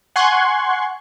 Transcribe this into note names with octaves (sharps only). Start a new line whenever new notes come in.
F#5 G#5 C6 C#6 F#6 G#6